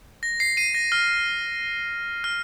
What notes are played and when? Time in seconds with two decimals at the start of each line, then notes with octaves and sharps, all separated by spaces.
0.23 A#6
0.40 C7
0.57 C7 D#7
0.74 A#6
0.92 F6
2.24 F6